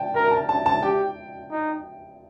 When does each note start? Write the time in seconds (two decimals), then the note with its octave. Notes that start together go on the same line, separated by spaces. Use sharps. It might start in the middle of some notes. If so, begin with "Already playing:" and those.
Already playing: G5 A5
0.14 A#4 A#5
0.28 A#5
0.31 A5
0.49 A5
0.66 A5
0.83 G4 G5
1.51 D#4